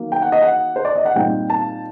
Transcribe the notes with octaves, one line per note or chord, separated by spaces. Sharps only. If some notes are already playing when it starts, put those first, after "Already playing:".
Already playing: D#3 F#3 A#3
G5
F#5
D#5
F#5
C5
D5
D#5
F#5
A#2 G3 C4 D#4 G5
A5